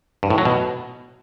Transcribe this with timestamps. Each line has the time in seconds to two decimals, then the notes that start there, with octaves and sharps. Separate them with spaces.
0.23 G2
0.30 A2
0.38 F#3
0.45 B2